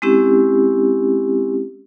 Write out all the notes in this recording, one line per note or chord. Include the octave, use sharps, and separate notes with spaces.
G#3 C4 C#4 E4 G4